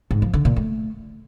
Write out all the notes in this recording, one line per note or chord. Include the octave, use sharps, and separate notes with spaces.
G#2
F3
D3
A#2
A3